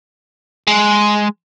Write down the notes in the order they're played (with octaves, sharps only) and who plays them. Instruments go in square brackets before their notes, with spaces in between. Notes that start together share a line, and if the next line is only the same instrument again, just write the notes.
[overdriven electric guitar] G#3